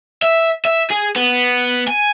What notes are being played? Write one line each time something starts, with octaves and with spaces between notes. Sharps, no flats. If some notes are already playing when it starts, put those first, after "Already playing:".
E5
E5
G#4
B3
G#5